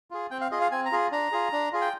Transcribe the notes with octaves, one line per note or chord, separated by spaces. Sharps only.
F4 G#4
C4 G5
F5
F4 G#4 D#5
F5
C4 G#5
A#5
F4 G#4
D4 A#5
F4 G#4
D4
F4 G#4
G5